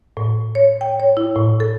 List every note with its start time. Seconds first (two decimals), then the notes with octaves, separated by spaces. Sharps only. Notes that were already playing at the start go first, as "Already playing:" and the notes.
0.17 A2
0.55 C#5
0.81 G5
1.00 C#5
1.17 E4
1.36 A2
1.60 A4